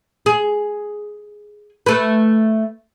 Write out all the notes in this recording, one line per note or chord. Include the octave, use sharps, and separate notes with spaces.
G#4
A3 B4